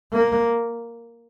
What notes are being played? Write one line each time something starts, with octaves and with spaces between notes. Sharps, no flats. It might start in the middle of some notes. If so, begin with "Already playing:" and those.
A#3